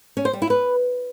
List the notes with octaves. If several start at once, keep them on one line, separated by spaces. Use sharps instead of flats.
C#4
C5
G3
E4
B4